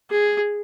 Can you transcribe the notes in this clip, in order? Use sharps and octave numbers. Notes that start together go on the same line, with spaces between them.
G#4